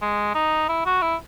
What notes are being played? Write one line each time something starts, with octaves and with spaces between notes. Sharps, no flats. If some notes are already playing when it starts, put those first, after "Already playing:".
G#3
D#4
E4
F#4
E4